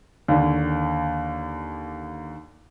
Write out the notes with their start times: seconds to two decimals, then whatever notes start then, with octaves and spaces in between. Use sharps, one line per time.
0.28 D#2 D3